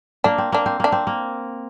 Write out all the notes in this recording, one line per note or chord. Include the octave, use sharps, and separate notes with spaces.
A#3 D4
C4
A#3 D4
C4
A#3 D4
C4
A#3